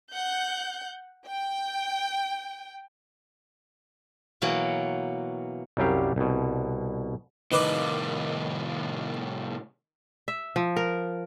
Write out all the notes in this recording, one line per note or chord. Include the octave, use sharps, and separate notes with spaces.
F#5 G6
G5
B2 E3 F#3 A#3
C2 F#2 F#3 G3 G4 F5
C2 B2
C2 A2 D#3 B4 D6
E5
F3
A#4